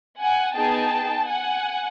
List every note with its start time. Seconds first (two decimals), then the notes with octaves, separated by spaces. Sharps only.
0.19 F#5 G#5
0.55 B3 D#4 G#4 G5 A5
1.27 F#5 G#5